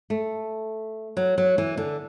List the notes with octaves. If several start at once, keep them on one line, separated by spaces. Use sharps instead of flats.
A3
F#3
F#3
E3
D3